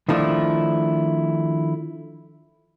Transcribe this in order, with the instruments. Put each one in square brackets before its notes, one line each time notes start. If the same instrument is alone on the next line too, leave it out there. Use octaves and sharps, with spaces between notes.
[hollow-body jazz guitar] D#3 F3 A3 D4 E4